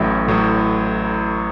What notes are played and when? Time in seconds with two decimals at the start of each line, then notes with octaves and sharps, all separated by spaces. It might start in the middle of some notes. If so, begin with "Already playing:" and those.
Already playing: A1 A2 F#3 E5
0.27 A1 A2 F#3